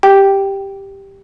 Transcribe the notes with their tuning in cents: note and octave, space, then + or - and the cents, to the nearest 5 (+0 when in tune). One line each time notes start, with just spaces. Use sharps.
G4 +0 G5 +0